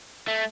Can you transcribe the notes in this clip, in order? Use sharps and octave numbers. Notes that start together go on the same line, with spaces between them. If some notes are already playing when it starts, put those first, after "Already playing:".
A3